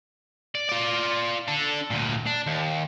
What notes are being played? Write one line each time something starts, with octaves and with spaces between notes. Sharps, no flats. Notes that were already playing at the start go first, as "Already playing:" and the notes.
D5
F4 D5
D4 A4
D2 A#2
D4
D#2